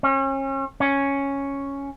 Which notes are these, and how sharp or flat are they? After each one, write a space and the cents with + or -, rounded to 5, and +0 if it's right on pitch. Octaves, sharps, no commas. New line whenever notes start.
C#4 -35
C#4 +0